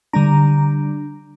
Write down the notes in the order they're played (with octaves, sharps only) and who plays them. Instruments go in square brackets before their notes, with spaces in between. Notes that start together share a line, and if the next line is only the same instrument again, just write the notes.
[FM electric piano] D3 G3 D4 A#5